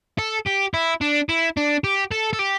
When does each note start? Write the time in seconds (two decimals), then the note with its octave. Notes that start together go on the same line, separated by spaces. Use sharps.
0.18 A4
0.46 G4
0.74 E4
1.01 D4
1.29 E4
1.57 D4
1.84 G4
2.12 A4
2.33 A4
2.39 G4